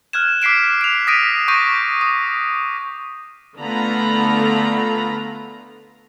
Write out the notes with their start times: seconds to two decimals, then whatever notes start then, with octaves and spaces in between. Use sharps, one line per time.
0.13 F6 F#6 G#6 E7
0.42 D6 B6 C7 D7 E7
0.81 D7 F7
1.07 D#6 A#6 B6 D7 D#7
1.48 C#6 D6 G6 A#6 D#7
2.01 D#6
3.61 D3 A3 B3 F4 A#5 B5